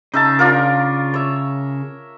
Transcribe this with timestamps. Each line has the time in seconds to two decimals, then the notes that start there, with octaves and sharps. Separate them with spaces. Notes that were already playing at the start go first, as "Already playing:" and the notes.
0.14 C#3 D#4 E5 A5
0.39 D4 F4 A#4
1.14 C#5 E5